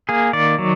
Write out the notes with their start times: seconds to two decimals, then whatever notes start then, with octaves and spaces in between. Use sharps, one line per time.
0.09 A#3 G#4
0.33 D#3 D5
0.59 F#3